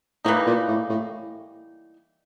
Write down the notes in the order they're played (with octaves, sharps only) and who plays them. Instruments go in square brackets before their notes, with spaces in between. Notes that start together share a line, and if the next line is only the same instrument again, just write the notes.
[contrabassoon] A2 [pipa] E3 G3 A#3 D#4
[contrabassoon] A#2
A2
A2